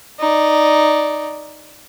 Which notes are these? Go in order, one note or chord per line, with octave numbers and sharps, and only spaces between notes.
D#4 D5